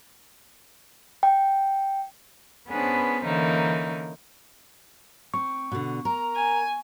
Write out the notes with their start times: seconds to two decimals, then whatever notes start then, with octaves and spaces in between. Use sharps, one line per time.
1.23 G5
2.68 B3 C#4 D4 G#4 B4 C5
3.23 D3 E3 A#3 C#4 D#4
5.34 C4 C#6
5.72 B2 D3
6.05 A#4 A#5
6.36 G#5